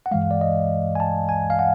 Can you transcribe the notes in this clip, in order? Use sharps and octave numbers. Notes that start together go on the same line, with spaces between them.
F#5
G2 E3 G#3 F5
D5
D#5
G#5
A5
G#5
F5
F#5